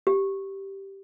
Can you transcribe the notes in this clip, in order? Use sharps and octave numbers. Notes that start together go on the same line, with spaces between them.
G4